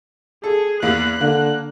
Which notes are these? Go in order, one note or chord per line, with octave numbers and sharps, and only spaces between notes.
G#4 A4
E2 A#3 F#6
D3 A#3